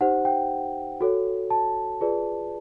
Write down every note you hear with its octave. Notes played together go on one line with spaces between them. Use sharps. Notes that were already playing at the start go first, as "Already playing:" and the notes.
D#4 G4 C5 F#5
G5
F#4 A4 C#5
A5
F4 G#4 B4 D5